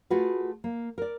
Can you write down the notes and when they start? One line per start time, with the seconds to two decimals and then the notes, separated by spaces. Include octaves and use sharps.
0.10 A3 F4 F#4 G#4 B4
0.64 A#3
0.98 A#4 D5